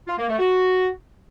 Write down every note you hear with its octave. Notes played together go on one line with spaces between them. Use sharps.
F4
A#3
A3
F#4